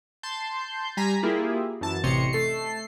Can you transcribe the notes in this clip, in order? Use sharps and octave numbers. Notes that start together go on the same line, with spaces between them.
A5 C6 G6
G3 G#5 A#5 B6
A#3 E4 F4 G4 G#4
F#2 E3 A5
A1 C3 C5 C#5 D#5 C#7
A3 A4 C7